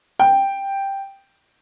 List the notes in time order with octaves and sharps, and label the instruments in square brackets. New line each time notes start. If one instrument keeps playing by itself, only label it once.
[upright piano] G5